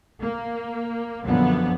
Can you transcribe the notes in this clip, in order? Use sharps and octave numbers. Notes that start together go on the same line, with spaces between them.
A#3
F#2 D3 F3 B3